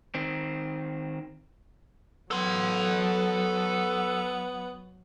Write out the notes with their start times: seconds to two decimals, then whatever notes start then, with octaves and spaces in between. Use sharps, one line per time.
0.14 D#3 C4
2.31 F#3 B3 A4 C6